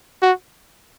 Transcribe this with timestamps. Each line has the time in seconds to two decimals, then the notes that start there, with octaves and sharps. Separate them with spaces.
0.22 F#4